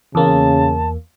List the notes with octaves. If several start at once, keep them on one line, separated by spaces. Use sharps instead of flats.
E2 C#3 A#3 A5